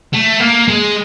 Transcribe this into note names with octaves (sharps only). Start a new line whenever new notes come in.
A3
A#3
G#3